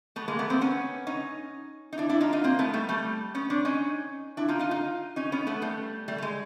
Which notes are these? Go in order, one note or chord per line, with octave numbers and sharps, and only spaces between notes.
A3 B3
G#3 A#3
A3 B3
A#3 C4
B3 C#4
C#4 D#4
D#4
D4 E4
D4 E4
D#4 F4
D#4 F4
A#3 C4
A3 B3
G3 A3
G3 A3
B3 C#4
C4 D4
C#4 D#4
D4 E4
D#4 F4
D#4 F4
D#4 F4
C#4 D#4
B3 C#4
A3 B3
G3 A3
G3 A3
A3
G#3